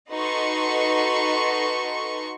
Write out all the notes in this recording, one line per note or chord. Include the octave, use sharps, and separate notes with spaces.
D#4 F#4 A4 B4 C6 C#6